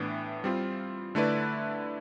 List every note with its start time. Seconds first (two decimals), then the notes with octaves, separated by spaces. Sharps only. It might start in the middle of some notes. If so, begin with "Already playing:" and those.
Already playing: A2 E3 B3 D4
0.44 G3 C4 F4
1.15 D3 A3 E4 B4 D5